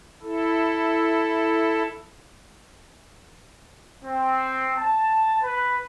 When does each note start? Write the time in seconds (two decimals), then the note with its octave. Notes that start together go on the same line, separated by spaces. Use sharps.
0.22 E4 A4
4.04 C4
4.77 A5
5.42 B4